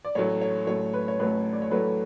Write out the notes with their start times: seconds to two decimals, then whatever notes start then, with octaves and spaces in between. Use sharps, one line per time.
0.05 D5
0.15 A1 A2 F#3 A3 C#5
0.41 C#5
0.67 A1 A2 F#3 A3 C#5
0.94 B4
1.08 C#5
1.19 A1 A2 F#3 A3 B4
1.52 D5
1.62 C#5
1.71 A1 A2 F#3 A3 B4